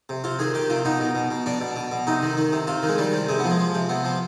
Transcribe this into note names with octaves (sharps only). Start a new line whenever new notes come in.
C3
C3 F4
D#3 G#4
D#3 G4
C3 F4
B2 D#4
B2
B2
B2
B2 D4
B2
B2
B2
C3 D#4
D#3
D#3
C3
C3 F4
D#3
G#3
D#3 G3
C3
C3 G#3
F3 B3
G#3
F3
C3
C3 B3
F3